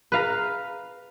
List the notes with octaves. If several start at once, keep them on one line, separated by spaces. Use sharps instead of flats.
B4 F5 A#5